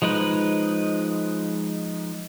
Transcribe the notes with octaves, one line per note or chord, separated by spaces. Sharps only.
F3 G#3 D#4 B4